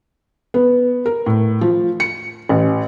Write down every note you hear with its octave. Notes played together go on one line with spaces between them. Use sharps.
B3
A#4
A2
F3
C#7
A1